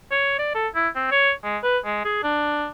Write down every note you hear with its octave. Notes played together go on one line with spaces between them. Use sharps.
C#5
D5
A4
E4
C4
C#5
G#3
B4
G#3
G#4
D4